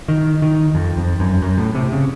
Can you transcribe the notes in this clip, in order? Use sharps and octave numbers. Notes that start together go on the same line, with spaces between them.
D#3
D#3
F2
F2
F#2
F#2
A2
C3
C#3